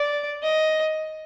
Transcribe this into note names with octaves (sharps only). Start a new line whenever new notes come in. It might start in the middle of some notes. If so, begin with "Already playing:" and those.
Already playing: D5
D#5